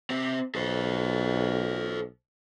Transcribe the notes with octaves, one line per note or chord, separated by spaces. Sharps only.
C4 G4
B1 A4 C5